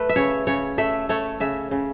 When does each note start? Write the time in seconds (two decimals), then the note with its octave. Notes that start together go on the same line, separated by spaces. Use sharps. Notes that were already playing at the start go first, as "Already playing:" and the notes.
Already playing: A3 B4
0.09 E5
0.16 C#3 C#5
0.47 C#3 C#5
0.78 A3 E5
1.09 A3 C#5
1.40 C#3 E5
1.71 C#3